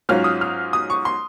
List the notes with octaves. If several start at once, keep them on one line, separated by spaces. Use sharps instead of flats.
G#2 F#3 C#4 F4 F6
D#6
F6
D#6
C#6
C6